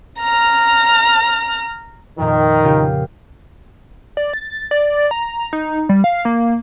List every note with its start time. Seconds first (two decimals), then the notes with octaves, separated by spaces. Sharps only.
0.21 A#5 F6
2.19 F2 A#2 D#3
2.65 C#3 F4 G4
4.17 D5
4.33 A6
4.71 D5
5.11 A#5
5.53 D#4
5.89 G3
6.04 F5
6.25 A#3